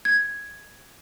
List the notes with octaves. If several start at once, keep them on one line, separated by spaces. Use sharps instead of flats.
G#6